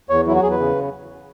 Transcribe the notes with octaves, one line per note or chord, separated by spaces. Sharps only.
E2 C#5
F#3 E4
F#4
E2 G#4
B4
C#3